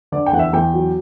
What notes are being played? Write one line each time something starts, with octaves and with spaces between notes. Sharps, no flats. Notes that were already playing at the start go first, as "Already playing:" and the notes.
D3 D5
G5
E2 F#5
E5
E2 G5
F#3